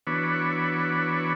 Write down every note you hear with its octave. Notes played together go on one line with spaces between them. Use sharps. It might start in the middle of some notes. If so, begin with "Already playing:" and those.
E3 B3 D4 F#4 B4 C#5